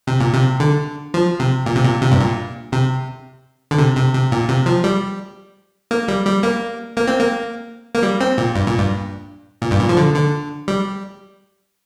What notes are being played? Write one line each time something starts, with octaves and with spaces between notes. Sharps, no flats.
C3
A#2
C3
D3
F3
C3
A#2
C3
A#2
C3
G2
A#2
C3
D3
C3
C3
C3
A#2
C3
F3
G3
A#3
G3
G3
A#3
A#3
C4
A#3
A#3
G3
C4
A#2
G2
A#2
G2
A#2
G2
A#2
F3
D3
D3
G3